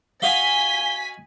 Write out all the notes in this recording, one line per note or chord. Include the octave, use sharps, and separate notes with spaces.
F#4 D#5 F5 G#5 B6 G7